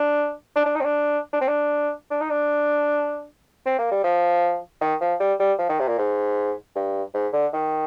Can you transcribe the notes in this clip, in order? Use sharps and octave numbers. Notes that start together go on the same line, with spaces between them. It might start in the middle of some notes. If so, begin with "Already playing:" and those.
Already playing: D4
D4
D4
D#4
C4
D4
D4
C4
D4
D4
D#4
D4
C4
A#3
G3
F3
D#3
F3
G3
G3
F3
D#3
C3
A#2
G#2
G2
G#2
D3
D#3